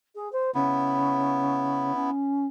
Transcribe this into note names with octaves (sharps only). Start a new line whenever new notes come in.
G#4
C5
C#3 B3 E4
C#4